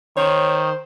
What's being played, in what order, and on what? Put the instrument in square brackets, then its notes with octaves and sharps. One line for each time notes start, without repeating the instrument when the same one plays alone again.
[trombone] D#3 [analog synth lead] C5 [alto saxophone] C#5